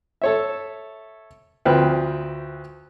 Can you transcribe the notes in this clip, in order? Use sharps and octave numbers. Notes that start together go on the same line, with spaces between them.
A4 C#5 E5
D2 F3 C4 B4 G5 F6